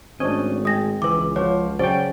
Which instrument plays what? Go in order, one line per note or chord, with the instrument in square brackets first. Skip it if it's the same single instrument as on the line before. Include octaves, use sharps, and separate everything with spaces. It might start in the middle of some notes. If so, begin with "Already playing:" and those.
[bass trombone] G#1 [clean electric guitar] A3 D#5 [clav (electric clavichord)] C#4 D4 [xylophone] C5 G#6
[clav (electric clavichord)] G#3 G5 G#5 [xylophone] D#6 A#6
[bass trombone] C#2 [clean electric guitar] E3 [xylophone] B4 D6
[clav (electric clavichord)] C#3 F#4 [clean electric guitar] F3 [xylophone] C#5 D6
[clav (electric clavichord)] C#3 F#3 [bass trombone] C#4 [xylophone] C5 [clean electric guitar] D5 G5